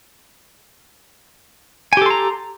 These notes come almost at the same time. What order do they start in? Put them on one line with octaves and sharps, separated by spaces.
G#5 G4 A4 C6 A#5